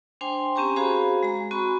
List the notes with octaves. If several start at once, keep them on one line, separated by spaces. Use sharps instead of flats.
D4 C5 G5 G#5 C6
C4 C#4 G4 G#5 A#5 C#6
F#4 G#4 C5 F5 A#5 B5
G#3 A#5
C4 F#4 G#5 B5 C#6